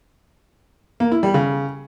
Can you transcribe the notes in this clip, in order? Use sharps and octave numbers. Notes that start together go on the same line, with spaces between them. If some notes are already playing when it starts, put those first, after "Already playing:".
A#3
E4
G3
C#3